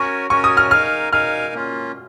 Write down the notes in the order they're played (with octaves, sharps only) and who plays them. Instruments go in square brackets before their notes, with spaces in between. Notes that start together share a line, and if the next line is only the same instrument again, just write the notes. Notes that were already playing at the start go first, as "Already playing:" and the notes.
Already playing: [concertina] C#4 F#4 A#4 C#5 G#5 [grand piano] C#6
[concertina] C#4 F#4 A#4 C#5 G#5 [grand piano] C#6
[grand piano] D#6
F6
[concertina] D#4 A#4 F5 G#5 [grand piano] F6
[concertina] D#4 A#4 F5 G#5 [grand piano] F6
[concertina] A#3 C#4 F4